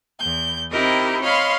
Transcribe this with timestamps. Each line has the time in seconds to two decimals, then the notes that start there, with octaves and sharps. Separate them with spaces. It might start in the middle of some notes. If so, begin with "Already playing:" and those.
0.19 E2 G6
0.71 C4 D#4 E4 G4 A#4 D#5
1.22 C#5 D#5 F5 B5 C6